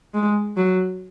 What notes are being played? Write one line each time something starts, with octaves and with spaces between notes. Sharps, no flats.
G#3
F#3